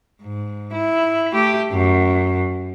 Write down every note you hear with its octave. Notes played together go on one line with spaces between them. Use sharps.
G#2
E4
A3 G4
F#2